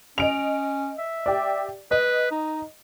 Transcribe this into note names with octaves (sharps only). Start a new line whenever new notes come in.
C#4 D#5 D7 F7
E5
G4 D5
B4 D#5
D#4